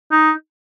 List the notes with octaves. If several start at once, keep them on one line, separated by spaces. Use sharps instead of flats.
D#4